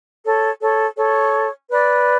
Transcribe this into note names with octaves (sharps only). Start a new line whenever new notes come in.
A4 C#5
A4 C#5
A4 C#5
B4 D5